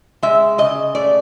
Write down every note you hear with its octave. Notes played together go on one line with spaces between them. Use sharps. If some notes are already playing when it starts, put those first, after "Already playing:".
G#3 E5
C#3 D#5
A3 D5